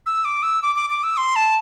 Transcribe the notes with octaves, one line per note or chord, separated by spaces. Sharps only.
E6
D6
E6
D6
D6
D6
E6
C6
A5